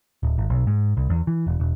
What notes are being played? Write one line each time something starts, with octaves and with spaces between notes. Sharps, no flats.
D1
G#1
B1
G#2
C2
E2
E3
E1
E1